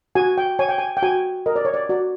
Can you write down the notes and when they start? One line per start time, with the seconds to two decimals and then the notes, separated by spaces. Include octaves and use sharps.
0.15 F#4 G#5
0.38 G5
0.59 C#5 G#5
0.69 G5
0.78 G#5
0.97 G5
1.02 F#4 G#5
1.46 A#4 D#5
1.56 D5
1.65 C#5
1.74 D5
1.89 F#4 D5